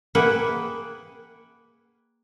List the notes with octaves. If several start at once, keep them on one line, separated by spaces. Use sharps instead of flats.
A#3 G#4 B4 E5 F#5 G5